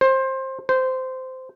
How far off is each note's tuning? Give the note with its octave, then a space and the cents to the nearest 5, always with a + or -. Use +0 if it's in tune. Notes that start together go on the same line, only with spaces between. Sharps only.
C5 +20
C5 -15